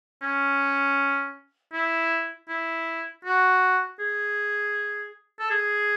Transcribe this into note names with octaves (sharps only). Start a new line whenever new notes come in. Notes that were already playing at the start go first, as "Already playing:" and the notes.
C#4
E4
E4
F#4
G#4
A4
G#4